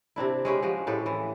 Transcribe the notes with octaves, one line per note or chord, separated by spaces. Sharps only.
C3 C4 D4 E4
G#3 C#4 G4 B4
F3 G#3 F#4 G4
A2 G4 A4 B4
E3